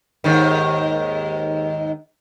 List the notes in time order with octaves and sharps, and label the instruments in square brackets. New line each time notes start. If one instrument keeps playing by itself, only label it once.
[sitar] D#2 G#2 D#3